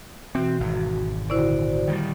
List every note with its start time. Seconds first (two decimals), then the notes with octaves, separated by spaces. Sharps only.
0.35 B2 E3 C4 F#4
0.60 G#1
1.30 A#2 D3 E4 F#4 C5 D5
1.88 D#3 F3 G3